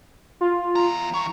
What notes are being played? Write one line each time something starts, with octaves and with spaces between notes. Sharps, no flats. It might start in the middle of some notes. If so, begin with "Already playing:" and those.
F4
E2 A#5
E3 A#5 C#6